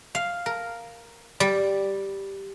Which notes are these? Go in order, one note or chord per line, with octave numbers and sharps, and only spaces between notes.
F5
A#4
G3